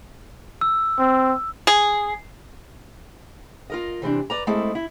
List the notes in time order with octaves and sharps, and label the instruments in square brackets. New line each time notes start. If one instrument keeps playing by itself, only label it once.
[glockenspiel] E6
[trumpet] C4
[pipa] G#4
[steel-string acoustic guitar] F4 A#4 D#5
C3 E3 C4 D4
B4 D5 A#5
G#3 A3 C4 E4 G#4 A4
E4